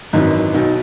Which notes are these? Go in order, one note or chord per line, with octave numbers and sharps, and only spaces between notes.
G#1 F#2 E3 D#4
B1 B2 D#4